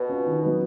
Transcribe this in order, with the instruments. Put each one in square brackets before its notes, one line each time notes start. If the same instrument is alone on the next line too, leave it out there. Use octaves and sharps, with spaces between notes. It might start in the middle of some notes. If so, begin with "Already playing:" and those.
Already playing: [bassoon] B2
[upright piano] C#4 F4
D#3
F#3 B3